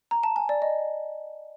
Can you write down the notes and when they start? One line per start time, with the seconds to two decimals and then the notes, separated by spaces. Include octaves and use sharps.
0.11 A#5
0.23 A5
0.36 G#5
0.49 D5
0.62 D#5